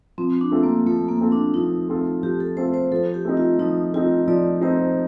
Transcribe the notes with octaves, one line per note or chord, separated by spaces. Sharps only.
F3 C4
D4
A3 C4 F4 A4
A#3
F3 A3
A#3
A3 C4 F4 A4
D4
F3 D#4
A3 C4 F4 A4
F3 G4
A4
A3 C4 F4 A4 C5
C5
F3 A4
G4
A3 C4 D#4
F4
F3 D#4
A3 C4 D#4 F4
F3 D5
A3 C4 D#4 C5